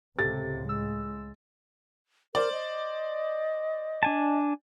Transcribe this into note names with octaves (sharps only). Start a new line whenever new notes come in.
C#2 A2 C3 G4 A4 A6
G#3 E6
A#4 C5 D5
D#5
D4 G#5 A5